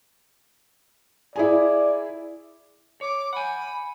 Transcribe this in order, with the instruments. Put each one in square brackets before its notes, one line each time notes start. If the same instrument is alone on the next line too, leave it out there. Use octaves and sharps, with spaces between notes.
[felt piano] E4 G#4 G#5 [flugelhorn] D5
[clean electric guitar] C#5 [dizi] D6
[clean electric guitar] F#5 G#5 [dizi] B5